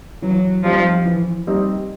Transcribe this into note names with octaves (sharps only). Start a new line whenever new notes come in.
E3 F#3
F3 G3 C4 D#4
E3
G3 C4 D#4